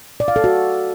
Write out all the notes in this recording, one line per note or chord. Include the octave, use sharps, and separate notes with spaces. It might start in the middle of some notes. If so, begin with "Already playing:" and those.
D5
F5
A4
F#4